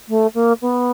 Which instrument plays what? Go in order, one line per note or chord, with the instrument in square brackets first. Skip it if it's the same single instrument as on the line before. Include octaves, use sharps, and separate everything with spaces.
[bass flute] A3
A#3
B3